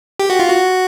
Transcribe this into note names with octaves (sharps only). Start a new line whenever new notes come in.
G4
F#4
F4
F#4